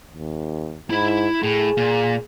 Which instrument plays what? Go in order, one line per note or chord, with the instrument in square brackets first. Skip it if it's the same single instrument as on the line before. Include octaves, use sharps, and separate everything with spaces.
[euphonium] D#2
[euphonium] G#2 [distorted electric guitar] E4 B5
[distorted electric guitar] A2 [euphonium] G#4
[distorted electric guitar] A#2